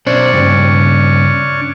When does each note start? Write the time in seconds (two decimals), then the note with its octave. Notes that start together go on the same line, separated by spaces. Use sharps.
0.06 B2 C#4 D4 C5 D5 C#6
0.33 G2 C#3